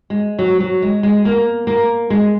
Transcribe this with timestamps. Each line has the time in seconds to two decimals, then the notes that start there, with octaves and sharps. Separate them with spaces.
0.10 G#3
0.39 F#3
0.60 F#3
0.82 G#3
1.03 G#3
1.25 A#3
1.67 A#3
2.10 G#3